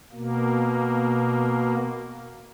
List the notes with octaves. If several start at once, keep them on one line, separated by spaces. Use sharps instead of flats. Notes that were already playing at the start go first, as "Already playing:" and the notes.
B2 A#3